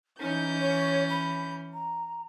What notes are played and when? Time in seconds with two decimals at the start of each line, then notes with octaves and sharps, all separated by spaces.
0.20 E3 C#4 D#4 G6
0.58 C#5
1.09 B5
1.73 A#5